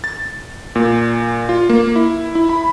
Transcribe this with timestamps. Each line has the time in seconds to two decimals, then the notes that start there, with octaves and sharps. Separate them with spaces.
0.04 A6
0.75 A#2
1.49 F4
1.69 A#3
1.96 E4
2.35 E4
2.49 B5